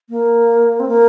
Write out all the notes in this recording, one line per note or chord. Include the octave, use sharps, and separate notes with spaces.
A#3
C4
A#3